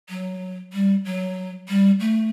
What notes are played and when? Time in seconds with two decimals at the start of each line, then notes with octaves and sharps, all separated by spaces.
0.09 F#3
0.73 G3
1.05 F#3
1.69 G3
2.00 A3